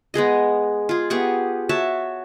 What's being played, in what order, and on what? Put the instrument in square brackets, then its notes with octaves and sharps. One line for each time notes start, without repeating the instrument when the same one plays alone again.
[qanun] G#3 B3 G#4 D#5
F4 G#4
B3 G4 G#4 C#6
F#4 C#5 E5 A5